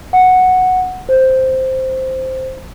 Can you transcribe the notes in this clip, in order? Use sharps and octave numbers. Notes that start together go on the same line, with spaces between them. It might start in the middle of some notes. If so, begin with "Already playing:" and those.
F#5
C5